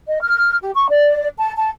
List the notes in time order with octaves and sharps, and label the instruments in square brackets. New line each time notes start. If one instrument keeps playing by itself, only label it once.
[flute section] D#5
F6
G4
C#6
D5
A5
A5